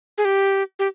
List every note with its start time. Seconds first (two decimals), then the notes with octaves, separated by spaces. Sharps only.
0.18 G#4
0.25 G4
0.79 G4